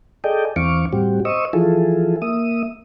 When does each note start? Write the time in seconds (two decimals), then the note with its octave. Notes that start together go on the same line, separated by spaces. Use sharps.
0.24 G#4 A4 D5 D#5 G5
0.56 E2 E3 C4 F5 C#6 D6
0.93 A2 G3 C4 F#4 G4
1.25 C5 D#5 C#6 D#6 E6
1.53 E3 F3 E4 F4 G#4 A4
2.22 A#3 E5 D#6